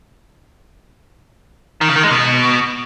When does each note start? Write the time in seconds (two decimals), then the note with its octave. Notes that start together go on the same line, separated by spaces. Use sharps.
1.81 D#3
1.89 C#3
1.96 D#3
2.03 G#3
2.11 B2